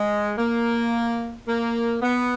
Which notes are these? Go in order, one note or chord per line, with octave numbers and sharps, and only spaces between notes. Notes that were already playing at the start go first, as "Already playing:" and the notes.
Already playing: G#3
A#3
A#3
B3